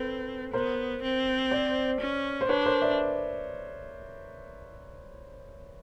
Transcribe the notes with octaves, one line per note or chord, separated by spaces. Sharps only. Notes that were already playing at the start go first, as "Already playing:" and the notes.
Already playing: C4 A4 B4
B3 A#4 C5
C4
C5 D5
C#4
C5
D4 B4 C#5
A#4 C5
D5 E5